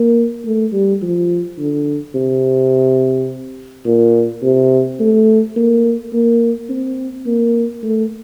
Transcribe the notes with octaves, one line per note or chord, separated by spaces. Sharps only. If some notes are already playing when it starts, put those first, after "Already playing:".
Already playing: A#3
A3
G3
F3
D3
C3
A#2
C3
A3
A#3
A#3
C4
A#3
A3